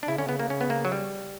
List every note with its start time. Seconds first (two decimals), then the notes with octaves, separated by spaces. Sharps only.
0.03 D4
0.08 C#3 E4
0.18 D3 C#4
0.26 C#3 B3
0.40 A#3
0.50 C#4
0.61 B3
0.70 A#3
0.85 F#3
0.92 G3